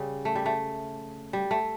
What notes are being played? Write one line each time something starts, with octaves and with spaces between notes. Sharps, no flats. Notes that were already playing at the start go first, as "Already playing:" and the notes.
Already playing: C#3 G3
A3
G3
A3
G3
A3